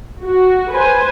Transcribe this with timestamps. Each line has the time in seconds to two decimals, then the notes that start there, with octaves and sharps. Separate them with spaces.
0.22 F#4
0.72 B4 C5 G#5